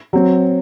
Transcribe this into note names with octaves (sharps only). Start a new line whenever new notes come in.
F#3 C4